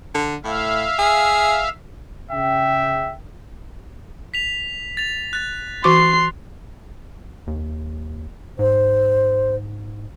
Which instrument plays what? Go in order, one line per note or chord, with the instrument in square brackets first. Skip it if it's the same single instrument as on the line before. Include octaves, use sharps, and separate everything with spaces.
[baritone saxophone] D3
[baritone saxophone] A2 [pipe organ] E5 F5
[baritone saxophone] G#4
[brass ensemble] C#3 G5 [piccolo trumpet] E5
[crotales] B6 F7
A6 F7
F#6 A6
[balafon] E3 F#4 D6 [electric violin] C6 C7
[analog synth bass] D#2
[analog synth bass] G#2 [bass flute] C5